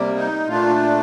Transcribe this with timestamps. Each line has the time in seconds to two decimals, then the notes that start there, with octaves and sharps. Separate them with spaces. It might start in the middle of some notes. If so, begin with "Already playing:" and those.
Already playing: C3 G3 A#3
0.16 D#4
0.47 A#2 A3 D4 F4